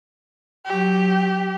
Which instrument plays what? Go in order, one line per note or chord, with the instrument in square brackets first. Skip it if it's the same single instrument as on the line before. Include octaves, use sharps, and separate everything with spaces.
[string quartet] F#3 [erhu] G4